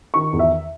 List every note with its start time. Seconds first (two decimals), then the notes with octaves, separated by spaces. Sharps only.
0.14 D#3 C#6
0.33 E2
0.39 E5